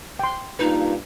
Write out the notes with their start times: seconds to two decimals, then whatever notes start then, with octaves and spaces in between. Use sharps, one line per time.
0.19 G5 C6
0.59 G2 A#3 D#4 F4 B4